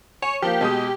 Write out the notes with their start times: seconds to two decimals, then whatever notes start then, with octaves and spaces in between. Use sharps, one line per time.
0.22 C#5 G#5
0.42 F3 A#3 G4
0.61 B2 G#3 D#6